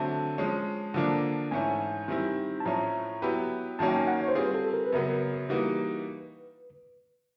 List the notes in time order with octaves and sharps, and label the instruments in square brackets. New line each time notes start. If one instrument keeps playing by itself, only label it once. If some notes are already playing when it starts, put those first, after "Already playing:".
Already playing: [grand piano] D3 F#3 A3 C4 [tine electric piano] A5
[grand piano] F3 G#3 C#4
D3 F3 A#3 D4
[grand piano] G#2 E3 A3 C#4 [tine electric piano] G#5
[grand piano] D#3 G3 C4 E4
[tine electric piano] A5
[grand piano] A2 F3 A3 C#4 [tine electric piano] A#5
[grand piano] F#3 B3 E4 G4 B4
[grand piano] F#2 D#3 F#3 A#3 C#4 [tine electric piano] A5
[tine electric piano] G5
G#5
F#5
C#5
C5
[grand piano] G3 C4 F4 G#4 [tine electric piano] B4
[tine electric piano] A4
A#4
B4
[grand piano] F#2 C#3 F#3 B3 [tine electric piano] A#4
[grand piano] E3 G3 A#3 D#4 F#4 [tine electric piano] B4